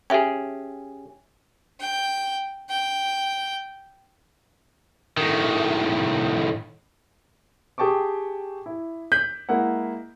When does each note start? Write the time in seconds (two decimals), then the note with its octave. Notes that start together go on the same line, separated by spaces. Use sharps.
0.10 C#4 G4 G#4 E5 G5
1.80 G5
2.70 G5
5.17 A2 D#3
7.78 G4 G#4 G5 A5 C#6 D6
8.66 E4
9.12 G6 B6 F#7
9.49 G#3 A#3 E4 F#5